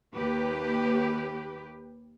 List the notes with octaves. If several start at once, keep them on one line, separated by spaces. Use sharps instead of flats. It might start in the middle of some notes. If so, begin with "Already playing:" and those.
D#2 G4 B4